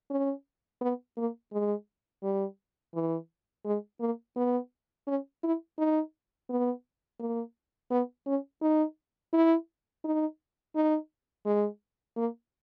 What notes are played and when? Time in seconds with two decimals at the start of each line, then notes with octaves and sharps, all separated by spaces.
0.11 C#4
0.81 B3
1.17 A#3
1.52 G#3
2.23 G3
2.95 E3
3.65 G#3
4.00 A#3
4.36 B3
5.07 C#4
5.43 E4
5.78 D#4
6.50 B3
7.20 A#3
7.90 B3
8.26 C#4
8.62 D#4
9.33 E4
10.04 D#4
10.75 D#4
11.45 G#3
12.17 A#3